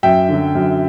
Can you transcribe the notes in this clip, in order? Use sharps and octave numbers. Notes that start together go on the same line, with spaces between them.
F#2 E5 G5
D3 F#3
F#2